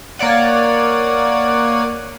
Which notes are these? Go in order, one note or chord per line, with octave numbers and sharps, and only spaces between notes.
A#3 C#5 D5 F#5 D#7